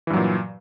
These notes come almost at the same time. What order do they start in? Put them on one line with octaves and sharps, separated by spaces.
E3 G2 F#3 A#2